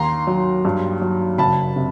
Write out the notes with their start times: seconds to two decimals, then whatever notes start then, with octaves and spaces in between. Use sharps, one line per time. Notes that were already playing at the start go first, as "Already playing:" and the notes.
Already playing: D#2 A#5 C6
0.27 F#3
0.65 G2
1.02 F#3
1.38 F#1 A5 B5
1.76 C3